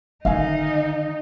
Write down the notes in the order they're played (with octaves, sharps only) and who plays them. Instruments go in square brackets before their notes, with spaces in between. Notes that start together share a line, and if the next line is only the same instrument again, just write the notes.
[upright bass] D3 D#3 [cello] D#4 [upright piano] E5 F5 G#5